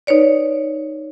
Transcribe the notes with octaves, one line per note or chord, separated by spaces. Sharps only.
D#4 B4 C#5 D5